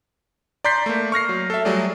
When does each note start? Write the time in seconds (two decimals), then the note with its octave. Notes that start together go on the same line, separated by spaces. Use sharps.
0.64 D5 A#5 C6 G6 B6 C7
0.86 A3 A#3
1.12 C#6 F6 A#6 C7
1.29 F#3
1.50 A4 E5
1.65 F#3 G3 A3 G#4 D5